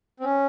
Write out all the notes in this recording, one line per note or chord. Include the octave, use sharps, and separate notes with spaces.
C4
C#4